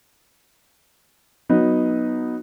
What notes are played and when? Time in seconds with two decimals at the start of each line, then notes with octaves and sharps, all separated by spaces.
1.49 F#3 B3 D#4